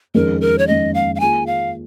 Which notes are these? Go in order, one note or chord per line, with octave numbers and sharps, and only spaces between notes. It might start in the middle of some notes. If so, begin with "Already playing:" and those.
F2 D#3 G#3 C#4 G#4 A#4
A#4
C#5
F2 D#3 G#3 C#4 G#4 D#5
F5
F5
D#3 A#3 F4 G#4 G#5
F5